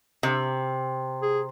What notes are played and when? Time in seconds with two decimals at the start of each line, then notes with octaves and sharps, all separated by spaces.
0.23 C3
1.22 G#4